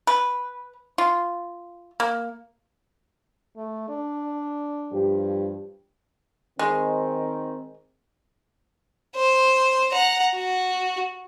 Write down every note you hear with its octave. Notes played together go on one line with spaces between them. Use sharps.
B4
F4
A#3
A3
D4
G2 F3 G4
D#3 G#3 C4
C5
F#5 A#5
F#4